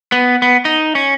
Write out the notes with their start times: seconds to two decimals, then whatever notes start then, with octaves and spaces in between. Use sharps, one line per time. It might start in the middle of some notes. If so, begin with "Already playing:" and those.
0.12 B3
0.42 B3
0.65 D#4
0.95 C#4